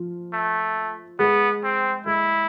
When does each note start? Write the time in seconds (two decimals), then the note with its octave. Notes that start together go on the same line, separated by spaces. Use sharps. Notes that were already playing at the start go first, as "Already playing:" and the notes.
Already playing: F3 F4
0.33 A3
1.19 G#3 B3 G#4
1.63 C4
2.06 G#3 E4 G#4